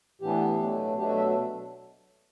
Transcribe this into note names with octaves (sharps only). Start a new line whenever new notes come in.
A2 E3 B3 D4 G4
B2 F#3 A3 D4
B2 F#3 A3 D4 G4
F#4
E5